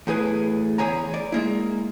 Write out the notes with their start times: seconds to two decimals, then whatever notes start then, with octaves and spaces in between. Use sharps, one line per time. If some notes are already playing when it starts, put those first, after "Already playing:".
0.07 E2 A2 G#4 B4
0.78 E2 G#4 C#5 G#5 A#5
1.14 D5
1.32 G#3 A#3 E4